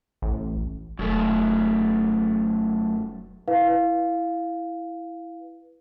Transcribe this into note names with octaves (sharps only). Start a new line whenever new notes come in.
A1
E1 F#2 A3
E4 B4 F5